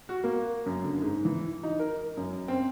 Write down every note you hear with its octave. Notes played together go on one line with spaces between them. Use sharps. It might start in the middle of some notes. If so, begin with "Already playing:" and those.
F#4
A#3
F#2
D3
G#2
E3
D#4
A#4
F#2
C4